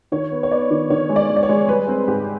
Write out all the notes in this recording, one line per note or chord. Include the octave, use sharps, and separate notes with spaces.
D#3 C#5
B3
C#5
B3 D5
D#3
D#3 C#5
G#3
D5
G#3
D5
C#5
G#3
G3 B4
C4
G#2 G4